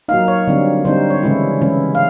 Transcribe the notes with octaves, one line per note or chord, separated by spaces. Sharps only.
F#3 A#3 D#4 F5
C#5
D3 G3 C4 D#4
D3 G3 C4 D#4 C5
C#5
C#3 E3 G#3 C#4 E4
C#3 E3 G#3 C#4 E4
F5